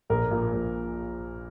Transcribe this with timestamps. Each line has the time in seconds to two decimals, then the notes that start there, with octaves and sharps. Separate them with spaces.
0.10 A#1 A#4
0.31 A#2
0.53 A#1